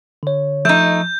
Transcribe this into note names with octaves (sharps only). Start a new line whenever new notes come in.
D3 C#5
F3 A3 D#4 G6